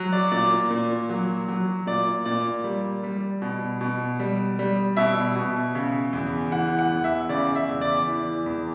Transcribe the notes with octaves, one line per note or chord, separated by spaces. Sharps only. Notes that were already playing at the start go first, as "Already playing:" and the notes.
Already playing: F#3
D5
A#2 D5
A#2
F#3
F#3
A#2 D5
A#2 D5
G3
G3
B2
B2
G3
G3
B2 E5
B2
C#3
E2
E3 F#5
F#5
E2
E5
C#3 D5
E5
E2
D5
E3
E2